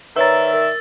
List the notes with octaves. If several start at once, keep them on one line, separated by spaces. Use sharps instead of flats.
D#3 B4 C#5 D5 E5 A#5 E6 A6
A#4